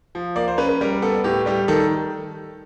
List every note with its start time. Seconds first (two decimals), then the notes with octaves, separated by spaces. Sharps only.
0.15 F3
0.36 A#3 D5
0.48 C5
0.58 C#4 B4
0.69 B4
0.81 G3 A#4
1.02 B3 A4
1.24 A2 G4
1.46 G3 G4
1.68 D#3 A4